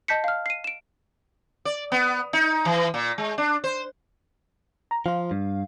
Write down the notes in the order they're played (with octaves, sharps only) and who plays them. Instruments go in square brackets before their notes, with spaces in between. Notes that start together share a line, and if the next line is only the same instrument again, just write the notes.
[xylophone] D#5 A5 G6 B6 C#7
F5 F6
C7 D#7
D7 E7
[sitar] D5
B3
D#4
E3
A#2
G#3
D4
C5
[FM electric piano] A#5
[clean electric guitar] F3 F4 [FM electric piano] F5
[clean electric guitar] G2